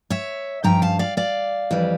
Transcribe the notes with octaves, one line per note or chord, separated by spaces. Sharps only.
C#5 E5
G2 F3 C#4 G5 A#5
F5 A5
D5 F5
D5 F5
F2 E3 G3